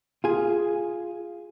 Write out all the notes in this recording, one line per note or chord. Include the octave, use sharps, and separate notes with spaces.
F4 G#4